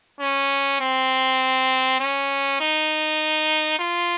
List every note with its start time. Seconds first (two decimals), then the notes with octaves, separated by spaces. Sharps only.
0.20 C#4
0.80 C4
2.00 C#4
2.60 D#4
3.79 F4